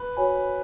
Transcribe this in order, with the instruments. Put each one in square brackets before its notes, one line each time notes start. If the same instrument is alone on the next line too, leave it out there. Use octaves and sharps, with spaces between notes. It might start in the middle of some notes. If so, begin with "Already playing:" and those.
Already playing: [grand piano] B4
[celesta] F#4 C#5 G#5 B5